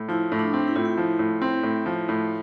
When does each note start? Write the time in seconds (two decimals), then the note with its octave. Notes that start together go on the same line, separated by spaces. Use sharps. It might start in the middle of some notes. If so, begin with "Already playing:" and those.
Already playing: A2
0.09 F3 E4
0.32 A2
0.39 D4
0.54 C4
0.68 E4
0.76 A2 F4
0.85 E4
0.97 F3
1.19 A2
1.42 C4
1.63 A2
1.86 F3
2.09 A2